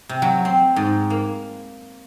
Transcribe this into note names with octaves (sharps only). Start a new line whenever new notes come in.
C3
F#3
C4
G#2
A#3